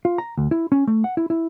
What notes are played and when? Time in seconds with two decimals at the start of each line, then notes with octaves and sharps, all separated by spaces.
0.05 F4
0.18 A#5
0.38 D2
0.51 E4
0.72 C#4
0.87 A3
1.04 F#5
1.17 E4
1.30 E4